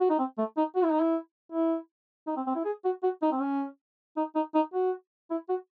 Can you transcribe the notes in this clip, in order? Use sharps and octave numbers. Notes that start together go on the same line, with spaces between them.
F#4
D#4
C4
A3
D#4
F#4
E4
D#4
E4
E4
D#4
C4
C4
E4
G#4
F#4
F#4
D#4
C4
C#4
D#4
D#4
D#4
F#4
E4
F#4